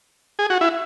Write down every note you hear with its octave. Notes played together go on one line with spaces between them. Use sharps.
G#4
F#4
E4